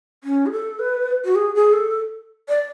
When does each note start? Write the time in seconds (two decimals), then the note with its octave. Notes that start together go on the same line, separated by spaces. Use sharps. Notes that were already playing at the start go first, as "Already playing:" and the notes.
0.24 C#4
0.46 G#4
0.52 A4
0.79 B4
1.25 F#4
1.35 G#4
1.55 G#4
1.73 A4
2.49 D5